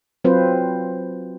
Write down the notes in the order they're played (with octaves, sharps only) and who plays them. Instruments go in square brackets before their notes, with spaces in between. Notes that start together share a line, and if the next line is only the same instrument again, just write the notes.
[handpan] F#3 C4 F4 B4 C5